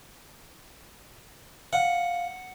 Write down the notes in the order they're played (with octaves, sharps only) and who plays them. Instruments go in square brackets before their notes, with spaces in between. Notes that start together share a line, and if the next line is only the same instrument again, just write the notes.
[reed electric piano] F5 [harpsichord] F#5